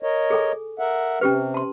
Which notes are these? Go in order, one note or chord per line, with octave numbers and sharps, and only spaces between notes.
A#4 C#5 D#5
G#4 A4 G#5
A#4 E5 F#5
C3 C#4 G4 B4
A5 C6